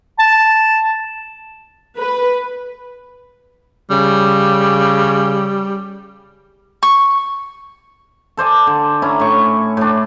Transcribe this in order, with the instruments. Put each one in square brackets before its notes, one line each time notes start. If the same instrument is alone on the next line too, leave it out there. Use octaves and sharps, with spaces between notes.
[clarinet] A5
[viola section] B4
[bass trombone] C#3 [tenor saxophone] G3
[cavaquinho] C#6
[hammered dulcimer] A4 C5 D5 G#5
D3
C#4 E4 A#5
A2 C#6
A2 D4